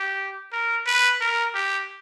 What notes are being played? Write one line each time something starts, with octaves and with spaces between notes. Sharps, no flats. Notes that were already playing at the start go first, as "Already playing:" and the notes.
Already playing: G4
A#4
B4
A#4
G4